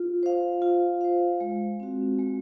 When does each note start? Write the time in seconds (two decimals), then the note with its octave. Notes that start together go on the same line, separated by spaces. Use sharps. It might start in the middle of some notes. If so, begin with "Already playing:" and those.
Already playing: F4
0.23 C5 F5
0.62 F4
1.01 C5 F5
1.41 G#3
1.80 C4 F#4
2.19 G#3